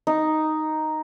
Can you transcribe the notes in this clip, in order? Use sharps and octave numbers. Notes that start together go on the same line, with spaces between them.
D#4